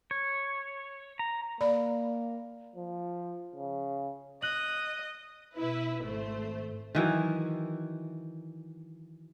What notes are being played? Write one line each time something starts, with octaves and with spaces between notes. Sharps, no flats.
C#5
A#5
A#3 D5 B5
F3
C#3
D#5 F#6 F#7
B2 E4 B4
G#1 A3 C5
D#3 E3 F#3